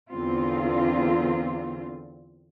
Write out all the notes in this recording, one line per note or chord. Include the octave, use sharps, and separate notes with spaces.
E2 D3 C4 F4